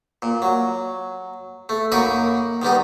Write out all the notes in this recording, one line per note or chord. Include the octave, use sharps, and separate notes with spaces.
A#2
F#3
A3
F#2 A#3 D#4 B5 C#6 D#6
D#3 G3 B3 D#4